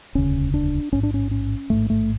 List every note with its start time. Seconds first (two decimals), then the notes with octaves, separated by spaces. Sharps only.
0.15 E1 D2 C#3 C#4
0.54 D4
0.92 A1 G#2 C#4
1.03 D4
1.14 C#4
1.31 C#4
1.70 A1 G#2 A3
1.90 A3